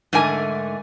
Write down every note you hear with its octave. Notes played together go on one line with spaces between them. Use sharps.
G#2 D3 A3 A#4 G#5